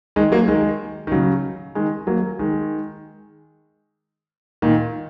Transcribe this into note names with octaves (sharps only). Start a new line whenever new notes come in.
D#3 G#3
F#3 A#3
D#3 G#3
D#3
C#3 F#3
D#3 G#3
F#3 A#3
D#3 G#3
A#2 D#3